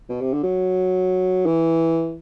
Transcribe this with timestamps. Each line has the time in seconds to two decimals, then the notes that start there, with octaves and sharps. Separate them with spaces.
0.09 B2
0.21 C3
0.33 D3
0.43 F#3
1.46 E3